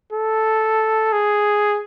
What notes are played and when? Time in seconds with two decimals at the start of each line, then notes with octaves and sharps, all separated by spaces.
0.13 A4
1.13 G#4